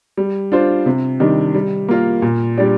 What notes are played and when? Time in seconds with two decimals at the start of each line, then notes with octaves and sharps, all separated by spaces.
0.17 G3
0.52 D4 F4 C5
0.86 C3
1.20 D#3 G3 D4
1.55 G3
1.89 A#3 F4 A#4
2.22 A#2
2.58 G3 D4 G4 D5